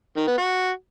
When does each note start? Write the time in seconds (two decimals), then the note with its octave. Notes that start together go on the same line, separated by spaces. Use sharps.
0.17 D#3
0.27 B3
0.38 F#4